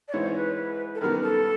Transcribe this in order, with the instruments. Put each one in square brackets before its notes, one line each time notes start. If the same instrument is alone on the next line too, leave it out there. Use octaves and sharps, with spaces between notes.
[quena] D5
[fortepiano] G#2 E3 G#3 C4 E4 [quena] C#5
[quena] B4
A4
[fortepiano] F#2 D#3 G3 B3 [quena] A#4
[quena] A4